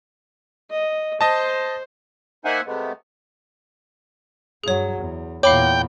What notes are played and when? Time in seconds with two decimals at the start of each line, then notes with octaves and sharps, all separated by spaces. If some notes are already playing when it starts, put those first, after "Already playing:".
0.71 D#5
1.21 C5 D#5 A5
2.45 A#3 D#4 C5 E5 F#5 G#5
2.66 C3 G#3 A3 B3
4.64 G2 F#3 G#4 C#5
4.98 E2
5.43 E2 A#2 C#5 F5 G5 B5 D6